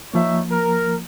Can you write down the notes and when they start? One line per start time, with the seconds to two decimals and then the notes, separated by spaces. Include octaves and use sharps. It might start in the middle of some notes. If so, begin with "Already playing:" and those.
0.14 F3 A#3 D#4 C#5 E5
0.51 A#4